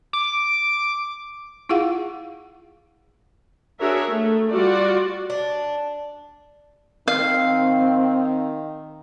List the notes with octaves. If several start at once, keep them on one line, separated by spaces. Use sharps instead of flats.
D6
E4 F4 G#4 F5 F#5
D4 F#4 G#4 A#4 C#5 E5
A3
G3 F4 F#4 D5
D4
D#3 C4 F5